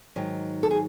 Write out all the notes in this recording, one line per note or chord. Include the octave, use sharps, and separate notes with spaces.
G#2 D#3 F#3
A4
G#4